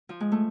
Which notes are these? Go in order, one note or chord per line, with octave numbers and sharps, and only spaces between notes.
F3
G#3
A3